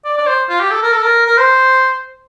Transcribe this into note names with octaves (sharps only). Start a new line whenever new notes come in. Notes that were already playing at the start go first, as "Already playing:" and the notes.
D5
D5
C5
F4
G4
A4
A#4
A4
A#4
A#4
C5